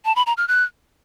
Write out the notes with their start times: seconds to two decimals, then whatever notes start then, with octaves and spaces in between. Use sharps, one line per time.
0.05 A5
0.16 B5
0.27 A#5
0.37 F6
0.48 F#6